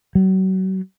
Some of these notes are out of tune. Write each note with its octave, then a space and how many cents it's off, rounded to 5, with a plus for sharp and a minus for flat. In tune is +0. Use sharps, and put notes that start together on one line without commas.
F#3 +35